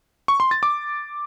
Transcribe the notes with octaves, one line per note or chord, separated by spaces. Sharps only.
C#6
C6
A6
D6